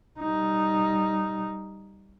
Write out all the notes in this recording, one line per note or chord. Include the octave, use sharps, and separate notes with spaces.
G3 D#4